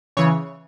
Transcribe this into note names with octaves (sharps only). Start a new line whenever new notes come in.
C#3 E3 C#5